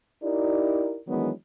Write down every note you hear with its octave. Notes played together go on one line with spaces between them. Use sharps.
D#4 E4 G4 A#4 D5
D#3 E3 F#3 G#3 B3 D4